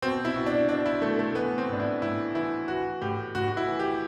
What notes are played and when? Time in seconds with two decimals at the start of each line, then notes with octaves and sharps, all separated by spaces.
0.02 B2 C4
0.25 E4
0.36 B2
0.46 D4
0.69 B2 D4
0.86 E4
1.02 B2 A3
1.19 A3
1.35 E3 B3
1.58 C4
1.69 A2 D4
1.80 E4
2.02 A2 E4
2.35 E3 E4
2.68 E3 F#4
3.02 A2 G4
3.35 A2 F#4
3.48 F#4
3.57 E4
3.68 E3
3.79 G4